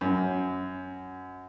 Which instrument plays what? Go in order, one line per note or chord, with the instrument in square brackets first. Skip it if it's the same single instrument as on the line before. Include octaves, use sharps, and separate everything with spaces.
[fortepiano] F#2